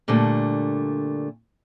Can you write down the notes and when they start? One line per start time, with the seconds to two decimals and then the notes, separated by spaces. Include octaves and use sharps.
0.08 A#2 D3 G3 A3 D4